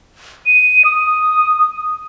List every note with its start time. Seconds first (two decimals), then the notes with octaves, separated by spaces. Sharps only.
0.47 D#7
0.85 D#6